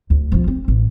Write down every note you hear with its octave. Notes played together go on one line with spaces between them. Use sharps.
D2
F3 F4
C4
A1